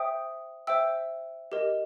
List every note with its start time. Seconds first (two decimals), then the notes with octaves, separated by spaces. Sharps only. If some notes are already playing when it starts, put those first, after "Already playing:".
Already playing: C5 E5 G5 D#6
0.67 C5 E5 G5 E6
1.52 G4 A#4 D#5